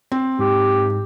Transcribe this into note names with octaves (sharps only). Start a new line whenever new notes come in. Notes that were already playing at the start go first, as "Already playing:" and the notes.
C4
G#2 G4